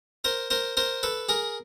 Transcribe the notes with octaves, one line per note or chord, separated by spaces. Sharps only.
A#4 C5
A#4 C5
A#4 C5
A4 B4
G#4 A#4